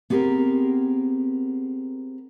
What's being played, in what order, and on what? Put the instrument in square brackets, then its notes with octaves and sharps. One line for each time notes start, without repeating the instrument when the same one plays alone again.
[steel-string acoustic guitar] B3 C4 G4 G#4 A#4